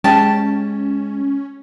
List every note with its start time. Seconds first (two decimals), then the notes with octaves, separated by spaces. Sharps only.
0.04 G#3 C#4 G4 A5